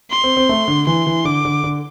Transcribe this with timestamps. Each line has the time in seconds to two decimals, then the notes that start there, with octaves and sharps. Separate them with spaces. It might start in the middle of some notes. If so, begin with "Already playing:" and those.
0.11 C6
0.24 C4
0.37 C4
0.49 A3
0.68 D3
0.87 E3 C6
1.07 E3
1.25 D3 D6
1.45 D3
1.64 D3